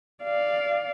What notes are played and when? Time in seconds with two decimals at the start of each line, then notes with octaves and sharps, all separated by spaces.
0.24 D5 F5